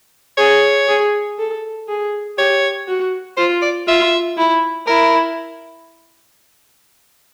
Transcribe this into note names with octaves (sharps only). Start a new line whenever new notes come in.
G#4 C#5
G#4
A4
G#4
G4 C#5
F#4
F4 C5
D5
F4 E5
E4
E4 A#4